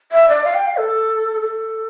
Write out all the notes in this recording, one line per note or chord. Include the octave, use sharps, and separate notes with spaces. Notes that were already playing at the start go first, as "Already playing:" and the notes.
E5
D5
F5
G5
F5
A4
A4